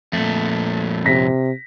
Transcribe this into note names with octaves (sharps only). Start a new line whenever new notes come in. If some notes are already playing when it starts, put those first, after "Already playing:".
F2 A#2 A3
C3 A#6 B6